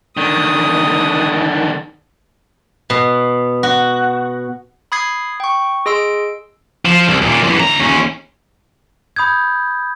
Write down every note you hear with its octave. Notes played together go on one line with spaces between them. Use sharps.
D3 D#3 D#6
B2
F#4
B5 D#6 G#6 C7
G5 C#6
G#4 D#5 C6 E6 D7
F3
C2
D#2 A#2
F#2 E3
D2 A#5
D#2 C#4
B5 D#6 G6 G#6